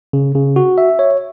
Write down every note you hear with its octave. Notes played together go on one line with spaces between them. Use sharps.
C#3
C#3
F#4
E5
C#5